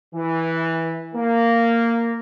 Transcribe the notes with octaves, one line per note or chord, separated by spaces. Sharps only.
E3
A#3